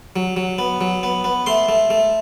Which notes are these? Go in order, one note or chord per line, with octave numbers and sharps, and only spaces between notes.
F#3
F#3
B3
F#3
B3
B3
A3 C6
A3
A3